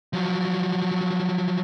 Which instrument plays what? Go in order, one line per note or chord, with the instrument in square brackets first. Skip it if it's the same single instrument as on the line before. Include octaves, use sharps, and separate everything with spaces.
[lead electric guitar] F3 F#3